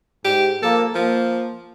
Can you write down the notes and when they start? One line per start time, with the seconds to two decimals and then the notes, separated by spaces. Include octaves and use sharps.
0.25 G#2 G4
0.63 F3 A#3 A4
0.95 F3 A#3